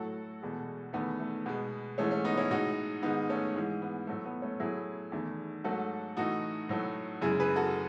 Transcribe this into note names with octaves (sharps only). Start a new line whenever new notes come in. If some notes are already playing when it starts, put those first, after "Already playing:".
Already playing: A2 F#3 A3 F#4 A4
E2 B2 G#3
E2 D#3 A3 B3
A3
B2 G#3 B3
G#2 E3 G#3 A3 C#4
A3 C#4
B3 D#4
C#4 E4
A2 G#3 D#4 F#4
G#2 D#3 G#3 B3 D#4
A3 C#4
G#2 E3 G#3
B3
A2 F#3 A3
B3
A3 C#4
A2 F#3 A3 E4 G#4
E2 D#3 A3
G#2 F#3 A3 F#4 A4
A2 E3 A3 D#4 F#4
A2 F#3 A3
F#2 C#3 G#3 E4 G#4
G#4 B4
F#4 A4